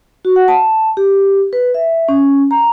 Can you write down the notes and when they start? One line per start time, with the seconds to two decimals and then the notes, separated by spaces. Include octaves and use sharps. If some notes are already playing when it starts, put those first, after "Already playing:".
0.25 F#4
0.36 F#5
0.48 A5
0.97 G4
1.53 B4
1.74 E5
2.09 C#4
2.51 A#5